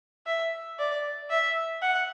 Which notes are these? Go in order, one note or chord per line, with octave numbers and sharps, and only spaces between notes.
E5
D5
E5
F#5